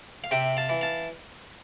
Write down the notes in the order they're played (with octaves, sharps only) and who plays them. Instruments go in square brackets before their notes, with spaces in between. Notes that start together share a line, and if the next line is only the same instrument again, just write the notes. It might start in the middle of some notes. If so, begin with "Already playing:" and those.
[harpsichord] F5
C3 E5 G5
F5 A5
E3
F5 A5